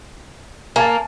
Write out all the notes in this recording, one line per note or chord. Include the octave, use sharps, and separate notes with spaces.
A#3 G#5 A5